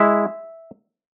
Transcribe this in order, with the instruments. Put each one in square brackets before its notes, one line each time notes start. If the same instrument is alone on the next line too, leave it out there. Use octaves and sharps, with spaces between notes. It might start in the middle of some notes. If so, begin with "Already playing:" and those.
Already playing: [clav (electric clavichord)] G#3 E4 E5